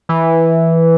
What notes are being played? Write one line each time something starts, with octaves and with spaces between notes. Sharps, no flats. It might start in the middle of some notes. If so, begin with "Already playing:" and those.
E3